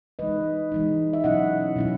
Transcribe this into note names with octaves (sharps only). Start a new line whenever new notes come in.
E3 G#3 D#4 B4 D#5
E3 G#3 D#4
E5
B2 F#3 C#4 E4 D#5 F#5
B2 F#3 C#4 E4